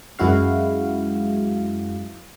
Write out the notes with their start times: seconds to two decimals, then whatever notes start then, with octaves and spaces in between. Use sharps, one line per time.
0.19 F#2 G#3 E4 F#4 F5